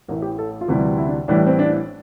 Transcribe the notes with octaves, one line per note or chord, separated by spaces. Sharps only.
A1 A2 E3 A#4
G4
A4
F4
D2 C3 E3 G3 G4
E4
D4
A1 A2 E3 G3 D4
C4
D4